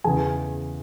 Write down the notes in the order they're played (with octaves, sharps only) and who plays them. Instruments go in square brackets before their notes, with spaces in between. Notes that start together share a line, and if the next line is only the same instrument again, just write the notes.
[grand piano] E2 C#3 E3 G#4 G#5